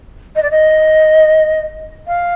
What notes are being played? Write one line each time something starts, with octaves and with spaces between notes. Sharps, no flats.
D#5
D5
D#5
F5